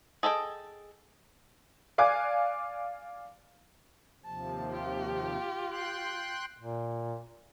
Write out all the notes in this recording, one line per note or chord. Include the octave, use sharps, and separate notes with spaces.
G#4 A4 D#5 E5 G5
D5 F5 G#5 D6 F#6 G#6
D#2 C3 F3 A5
F4 G4
G5 C6 F#6
A#2